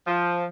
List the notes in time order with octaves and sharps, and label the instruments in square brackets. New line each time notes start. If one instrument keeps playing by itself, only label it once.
[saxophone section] F3